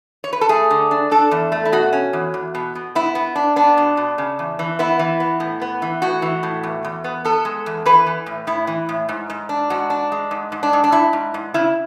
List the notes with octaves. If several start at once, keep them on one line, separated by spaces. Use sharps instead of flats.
C#5
B4
A4
A3 G#4
D3
D4
D4 A4
E2
A3
E4
B2 F#4
C#4
E2
E2
B2
B2
B3 E4
B3
D4
B3 D4
B2
B2
C#3
E2
E3
B3 E4
E3
B3
A2
B3
E3
A2 F#4
E3
A2
E2
E2
B3
B3 A4
G#3
E2
E3 B4
E3
A2
A2 E4
E3
A2
G#2
G#2
D4
G#2 F#4
D4
G#3
G#2
G#2
D4
G#2
D4
G#2 E4
G#2
G#2
C#3 E4